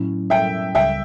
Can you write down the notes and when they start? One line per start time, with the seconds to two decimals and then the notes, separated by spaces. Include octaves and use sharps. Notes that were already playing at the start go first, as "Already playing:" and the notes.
Already playing: A2 F#3 C#4 E4
0.30 E5 G5
0.75 C#2 C#3 G3 E5 G5